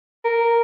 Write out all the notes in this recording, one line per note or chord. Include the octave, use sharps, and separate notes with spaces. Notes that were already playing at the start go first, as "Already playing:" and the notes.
A#4